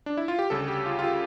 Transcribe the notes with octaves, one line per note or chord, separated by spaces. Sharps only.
D4
E4
F4
G4
D2 C#3 G3 A4
G4
F4
F4
G4